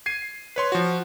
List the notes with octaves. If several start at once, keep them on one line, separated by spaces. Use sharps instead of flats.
G#6 C7 D#7
B4 C#5 C6
F3 F#4